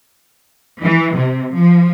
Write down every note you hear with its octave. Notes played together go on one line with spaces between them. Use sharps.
E3
C3
F3